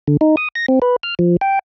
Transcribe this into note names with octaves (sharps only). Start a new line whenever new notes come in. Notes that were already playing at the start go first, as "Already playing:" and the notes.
D3
D#4
D#6
A#6
C4
B4
F6
F3
G5